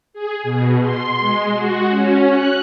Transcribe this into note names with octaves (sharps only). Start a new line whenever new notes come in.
G#4
B2
C6
G#3
F#4
C#4
F#6